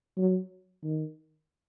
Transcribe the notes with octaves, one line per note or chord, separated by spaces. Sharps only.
F#3
D#3